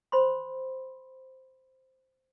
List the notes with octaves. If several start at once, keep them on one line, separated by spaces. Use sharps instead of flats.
C5 B5 C6